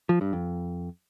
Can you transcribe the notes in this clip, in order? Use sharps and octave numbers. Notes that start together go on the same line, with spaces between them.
F3
G2
F2